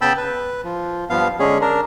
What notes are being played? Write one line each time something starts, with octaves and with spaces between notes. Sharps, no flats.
C#3 B3 G5 A5 B5 E6
B4
F3
G2 F3 B3 F5
D3 G#3 C#4 G#4
D4 A#4